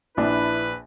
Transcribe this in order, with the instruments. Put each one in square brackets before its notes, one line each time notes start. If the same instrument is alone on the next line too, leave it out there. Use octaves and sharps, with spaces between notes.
[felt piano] A#1 D4 A5 [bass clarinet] E4 [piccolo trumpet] B4